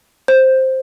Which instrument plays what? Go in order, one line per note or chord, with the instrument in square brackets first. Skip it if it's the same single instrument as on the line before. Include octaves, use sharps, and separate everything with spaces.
[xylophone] C5